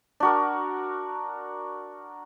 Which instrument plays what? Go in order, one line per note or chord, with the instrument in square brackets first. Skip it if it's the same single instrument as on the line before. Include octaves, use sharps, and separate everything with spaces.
[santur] D4 F#4 A#4